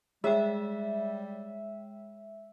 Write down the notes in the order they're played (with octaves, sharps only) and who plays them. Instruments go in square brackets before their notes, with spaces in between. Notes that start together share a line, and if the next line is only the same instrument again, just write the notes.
[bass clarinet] G3 [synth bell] G#3 C#5 G5 [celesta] G#4 [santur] E5